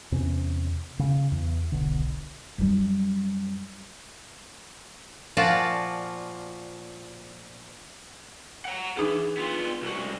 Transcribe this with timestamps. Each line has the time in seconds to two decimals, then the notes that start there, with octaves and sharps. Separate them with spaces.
0.12 E2 C3 C#4
0.99 C#3
1.32 E2
1.72 D#1 B1 D3
2.58 F#2 G3
5.37 A#2 F3 F4 F#4 D5 A5
8.65 F#5 A#5
8.97 E3 D4 D#4 G#4
9.37 B3 F4
9.82 C2 F#4